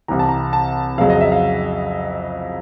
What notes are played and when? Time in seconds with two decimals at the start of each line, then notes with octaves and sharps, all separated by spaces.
0.08 C2 C3 E3 A#5
0.19 A5
0.29 A#5
0.53 A5
0.98 F2 C#3 F#3 F5
1.10 D#5
1.20 E5
1.32 F5